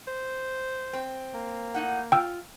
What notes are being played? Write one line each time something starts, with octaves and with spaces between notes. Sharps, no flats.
C5
C4
A#3
A2 D#4 F#5
F4 G5 E6